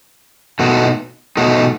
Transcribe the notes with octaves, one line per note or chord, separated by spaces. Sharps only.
B2 A3 D#4 F#4
B2 A3 D#4 F#4